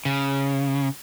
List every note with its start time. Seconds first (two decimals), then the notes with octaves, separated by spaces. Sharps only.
0.05 C#3